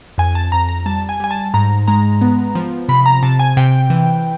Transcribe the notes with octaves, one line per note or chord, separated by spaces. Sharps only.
F2 G#5
A5
F2 A#5
A#5
G3 A5
G#5
G3 G#5
A5
G#2 A#5
G#3 A#5
B3
F3
C3 B5
A#5
C3 A5
G#5
C3 G5
E3